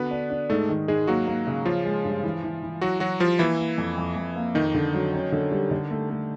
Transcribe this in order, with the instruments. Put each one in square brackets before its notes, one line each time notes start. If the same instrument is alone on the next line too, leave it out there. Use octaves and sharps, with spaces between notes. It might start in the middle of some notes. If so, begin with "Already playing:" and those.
Already playing: [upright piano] D3 F#4 [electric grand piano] B3 B4
[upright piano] D4
D4
[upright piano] G#2 [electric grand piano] A3 A4
[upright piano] D#3
[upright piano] G#2 [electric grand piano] G#3 G#4
[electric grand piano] F#3 F#4 [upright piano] A#3
[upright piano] A#3
C#3
[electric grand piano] F3 F4 [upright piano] C#4
[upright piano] G#3
G2
E3
E3
E3
[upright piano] E3 [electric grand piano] F#3 F#4
[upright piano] E3 [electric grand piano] F#3 F#4
[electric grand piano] F3 F4 [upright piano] G3
[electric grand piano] E3 E4 [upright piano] A#3
[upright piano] A#3
F2
F2
F2
A#3
[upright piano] F2 [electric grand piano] D#3 D#4
[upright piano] D3
F#3
C#4
D3
G3
D3
A3
A3